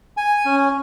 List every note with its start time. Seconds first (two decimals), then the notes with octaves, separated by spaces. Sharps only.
0.17 G#5
0.46 C#4